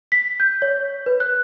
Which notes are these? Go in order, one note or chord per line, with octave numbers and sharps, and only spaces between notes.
B6
G6
C#5
B4
F#6